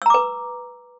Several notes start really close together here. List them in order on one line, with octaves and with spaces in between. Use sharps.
E6 A#5 D6 B4